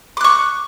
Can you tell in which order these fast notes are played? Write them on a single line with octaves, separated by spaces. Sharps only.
D6 F#6 C#6